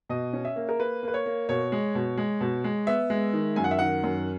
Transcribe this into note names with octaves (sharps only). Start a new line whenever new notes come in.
B2 D#5
C#4
E5
A#3
A#4
A#3 B4
A#3 B4
C#5
A#3
B2 C#5
G#3
B2
G#3
B2
G#3
B3 E5
G#3
D#3
F#2 G#5
F#5
E5
D#3 F#5
F#2